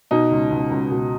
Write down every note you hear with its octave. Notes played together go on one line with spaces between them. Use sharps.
B2 D#4
C#2
C#2
C#2
B2